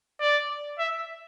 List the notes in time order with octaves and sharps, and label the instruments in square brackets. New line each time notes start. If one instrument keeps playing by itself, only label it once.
[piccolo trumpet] D5
E5